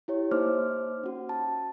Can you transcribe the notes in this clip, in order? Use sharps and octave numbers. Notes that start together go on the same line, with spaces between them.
E4 G4 C#5
A#3 D#4 C5 D6 F6
C#4 F#4
A5